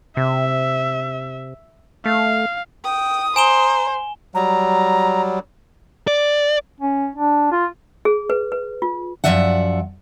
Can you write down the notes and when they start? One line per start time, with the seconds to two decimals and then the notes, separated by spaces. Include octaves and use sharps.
0.17 C3 E5
2.06 A3 F5
2.84 G5 D#6
3.36 C5 G#5 A#5 E7 G7
4.35 F#3 G3 A#5
6.07 D5
6.81 C#4
7.16 D4
7.52 F4
8.05 G#4
8.30 B4
8.52 B4
8.82 F4
9.24 F#2 D#3 F3 D5 E5 F#5